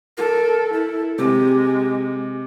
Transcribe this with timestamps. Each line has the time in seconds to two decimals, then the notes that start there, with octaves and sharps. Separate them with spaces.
0.18 A4 A#4
0.73 E4 A4
1.18 C3 G#3 G4